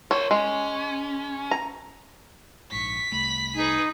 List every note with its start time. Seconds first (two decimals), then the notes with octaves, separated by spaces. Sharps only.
0.11 A#4 C5 C#5
0.31 G#3 C#4
1.51 A#5
2.72 A#1 G#2 C#6 B6
3.12 C2 A3 B5
3.55 D#4 G#4 B4